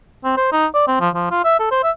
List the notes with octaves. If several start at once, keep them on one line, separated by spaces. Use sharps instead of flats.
C4
C5
D#4
D5
C4
F3
F3
F4
E5
A4
C5
E5